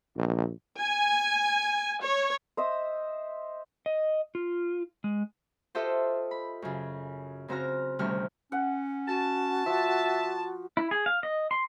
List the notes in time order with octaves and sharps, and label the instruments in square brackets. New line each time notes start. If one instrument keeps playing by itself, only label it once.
[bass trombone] A#1
[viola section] G#5
C#5
[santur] C5 D#5 E5 D#6
[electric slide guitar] D#5
F4
G#3
[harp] F4 G4 A4 C5 D#5 E5
B5
F#2 C#3
C#3 C4 F#4 A#5 F6
D2 C3 D#3 G3 C#4 F6
[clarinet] C#4 [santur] F#5
[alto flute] F#4 [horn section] A5
[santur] F3 [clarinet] E5
[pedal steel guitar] E4
G#4
F5
D#5
C6